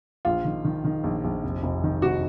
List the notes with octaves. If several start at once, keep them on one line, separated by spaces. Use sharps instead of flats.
A#1 F4
D#3
D#3
D#3
A#1
A#1
F1
F1
D#3
F1 F#4